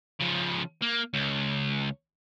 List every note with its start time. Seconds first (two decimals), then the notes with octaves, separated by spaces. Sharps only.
0.20 C#3 F3
0.82 A#3
1.14 C#2